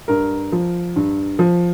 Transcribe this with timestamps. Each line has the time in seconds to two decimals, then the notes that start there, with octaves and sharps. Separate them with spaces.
0.08 G2 A#4
0.52 F3
0.96 G2
1.39 F3